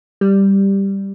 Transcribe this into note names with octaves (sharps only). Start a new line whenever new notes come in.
G3